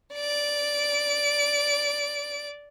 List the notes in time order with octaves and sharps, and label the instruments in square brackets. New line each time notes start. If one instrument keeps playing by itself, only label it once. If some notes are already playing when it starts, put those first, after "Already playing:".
[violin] D5 D7